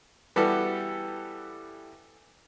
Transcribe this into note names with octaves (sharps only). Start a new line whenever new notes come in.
E3 G3 B3 F#4 G4 A4